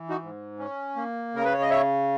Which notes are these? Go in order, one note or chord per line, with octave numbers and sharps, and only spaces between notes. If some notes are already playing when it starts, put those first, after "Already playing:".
Already playing: E3
D#4 F#4
G#2
C#4
A#3
C#3 A#4
B4
C#5
D#5
C#5 E5